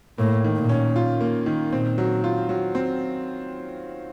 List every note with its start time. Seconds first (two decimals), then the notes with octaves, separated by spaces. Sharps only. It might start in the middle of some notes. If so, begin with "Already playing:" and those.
0.18 A2 A#3
0.44 D#3
0.56 A#2
0.69 C#4
0.96 F4
1.21 A#3
1.46 D#3
1.72 A#2 C4
1.98 F#3
2.24 F4
2.49 F#3
2.75 C4